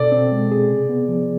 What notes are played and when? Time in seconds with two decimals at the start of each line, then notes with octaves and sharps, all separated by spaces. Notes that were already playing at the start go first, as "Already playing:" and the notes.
Already playing: B2 A4 D5
0.12 C4
0.32 G#3
0.52 G#4
0.70 C3
0.89 B3
1.08 F3